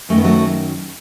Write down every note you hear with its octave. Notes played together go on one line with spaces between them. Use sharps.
F#2 D#3 A3
B3
F#3 A3